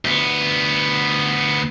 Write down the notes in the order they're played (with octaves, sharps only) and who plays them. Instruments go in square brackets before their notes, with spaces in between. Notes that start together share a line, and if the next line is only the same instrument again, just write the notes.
[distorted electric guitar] D2 B3